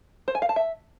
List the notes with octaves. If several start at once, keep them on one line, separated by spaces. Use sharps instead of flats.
C5
G#5
F5
A5
E5